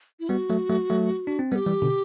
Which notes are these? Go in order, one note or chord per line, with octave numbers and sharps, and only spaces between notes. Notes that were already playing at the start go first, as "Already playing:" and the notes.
E4
G3 B3 F#4
F#3 A3
F#3 A3
F#3 A3
D4
C4
G3 B3 B4
G4
E3 G3
B2 D3